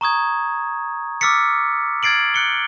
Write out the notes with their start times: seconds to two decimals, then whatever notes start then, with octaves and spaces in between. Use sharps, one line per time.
0.01 A#5 C#6 D#6 G#6
1.21 D6 E6 F6 A6 B6 C#7
2.03 F6 G#6 A6 C7 D7 F#7
2.34 F#6 C#7 G7